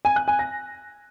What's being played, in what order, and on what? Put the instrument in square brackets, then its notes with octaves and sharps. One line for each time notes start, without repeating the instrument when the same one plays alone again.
[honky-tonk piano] G#5
F#6
G#5
A#6